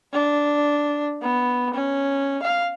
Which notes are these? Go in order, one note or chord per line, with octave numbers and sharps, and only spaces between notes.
D4
B3
C#4
F5